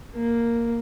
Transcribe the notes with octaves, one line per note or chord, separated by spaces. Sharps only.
A#3